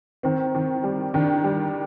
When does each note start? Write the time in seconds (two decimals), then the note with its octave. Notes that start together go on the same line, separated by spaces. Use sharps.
0.23 D#3 C4
0.55 D#3
0.84 G3
1.14 D#3 D4
1.44 G3